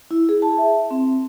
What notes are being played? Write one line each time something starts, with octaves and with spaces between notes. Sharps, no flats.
E4
G#4
A5
E5
C4